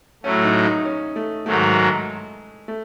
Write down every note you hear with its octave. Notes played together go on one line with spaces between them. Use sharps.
A2 F#3 A3 C#4
D#4
D#4
C#4
A3
G#2 D#3 F#3 A3
G#3
A3